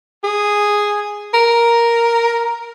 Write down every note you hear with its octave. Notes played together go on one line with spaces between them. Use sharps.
G#4
A#4